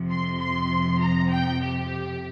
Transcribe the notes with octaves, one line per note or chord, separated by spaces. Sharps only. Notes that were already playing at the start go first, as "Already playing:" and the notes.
Already playing: F2 C3 F3
C6
C6
A#5
G5
G4